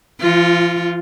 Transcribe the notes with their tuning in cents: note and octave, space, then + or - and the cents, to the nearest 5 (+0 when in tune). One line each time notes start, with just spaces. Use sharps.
F3 -40 F4 +0